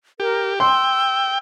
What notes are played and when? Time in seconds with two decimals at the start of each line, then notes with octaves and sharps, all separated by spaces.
0.20 G4 A#4
0.60 G5 C6 E6